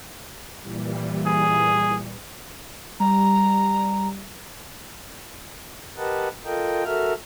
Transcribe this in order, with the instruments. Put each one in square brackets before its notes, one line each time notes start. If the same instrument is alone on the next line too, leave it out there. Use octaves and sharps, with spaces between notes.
[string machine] A#2 E3 G3
[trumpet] G#4
[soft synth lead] G3 [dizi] A#5
[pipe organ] G4 A#4 B4 D#5 F#5 A5
F4 A4 A#4 D#5 G5
F#4 A4 A#4 E5 F6